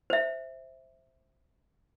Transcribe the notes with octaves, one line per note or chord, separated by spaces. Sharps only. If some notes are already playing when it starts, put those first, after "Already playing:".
C5 E5